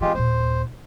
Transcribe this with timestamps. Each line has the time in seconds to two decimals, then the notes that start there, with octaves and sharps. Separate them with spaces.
0.01 E3 G#3 C4 F4 G4
0.15 D#2 A#2 C5